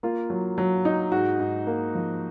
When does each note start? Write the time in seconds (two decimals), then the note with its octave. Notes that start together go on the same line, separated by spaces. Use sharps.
0.03 A#3 F4
0.30 F#3
0.58 F#3
0.85 D#4
1.12 G#2 F#4
1.40 G#2
1.67 A#3
1.95 F3